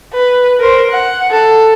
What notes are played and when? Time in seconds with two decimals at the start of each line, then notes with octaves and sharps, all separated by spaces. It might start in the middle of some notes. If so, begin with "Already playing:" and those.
0.13 B4
0.60 A#4 C5
0.90 F#5
1.31 A4